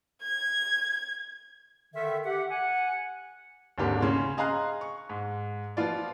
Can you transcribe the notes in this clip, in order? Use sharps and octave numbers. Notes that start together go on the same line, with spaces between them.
G#6
D3 D#3 E5
G4 F#5
F#5 G#5
G#1 D#2 G#2 D3 G4 A#4
C#3 C#4 C6
G#4 D#5 F5 A#5 C6 F#6
C#6
G#2
F3 B3 F4 D5